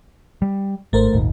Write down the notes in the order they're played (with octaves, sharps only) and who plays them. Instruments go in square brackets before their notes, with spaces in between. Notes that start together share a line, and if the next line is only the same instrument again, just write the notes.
[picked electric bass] G3
[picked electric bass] G#1 [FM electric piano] A3 A#4 C5
[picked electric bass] D#1 G#1 D#2